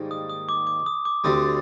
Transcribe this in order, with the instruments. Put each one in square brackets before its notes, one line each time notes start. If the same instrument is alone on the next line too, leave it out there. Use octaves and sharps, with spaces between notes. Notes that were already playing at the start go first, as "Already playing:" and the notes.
Already playing: [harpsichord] G#2 D#3 G3 A#3
[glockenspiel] D#6
D#6
D6
D6
D#6
D6
[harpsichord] D2 D3 G3 C4 [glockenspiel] D#6